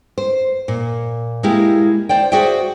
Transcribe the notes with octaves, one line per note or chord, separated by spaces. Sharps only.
C5
A#2
G#3 A#3 E4 G4
C5 D5 G5
F#4 G#4 C5 D5 E5 G5